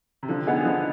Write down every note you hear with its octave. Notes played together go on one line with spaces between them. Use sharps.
C3
D3 F3
B3 D#4 G#4
D3 F3